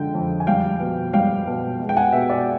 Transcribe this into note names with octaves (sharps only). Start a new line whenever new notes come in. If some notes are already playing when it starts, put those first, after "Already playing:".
Already playing: D3 F3 G#3 G5
F2
G#5
G3 F5 G5
B2
G3 F5 G5
B2
G#3
G5
F#5 G#5
B2 E5 F#5
D5 E5